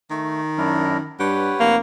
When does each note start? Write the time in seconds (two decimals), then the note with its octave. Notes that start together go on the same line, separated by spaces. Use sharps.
0.10 D#3 A3
0.58 F#2 D4 E4 A#4
1.20 G2 G4 B4 C#5 F#5
1.60 F1 A#3